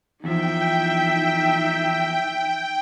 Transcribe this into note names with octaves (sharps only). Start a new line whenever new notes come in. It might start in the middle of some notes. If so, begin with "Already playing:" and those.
E2 F3 D#4 E5 G5